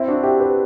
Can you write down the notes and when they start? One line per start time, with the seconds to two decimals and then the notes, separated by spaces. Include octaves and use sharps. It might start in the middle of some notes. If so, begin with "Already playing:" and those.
Already playing: C4 E4
0.08 D4 F#4
0.23 E4 G4
0.40 G4 B4